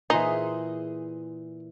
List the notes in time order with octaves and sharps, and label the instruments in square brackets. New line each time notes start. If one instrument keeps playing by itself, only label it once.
[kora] A#2 E3 [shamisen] D#4 [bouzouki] G#4 C5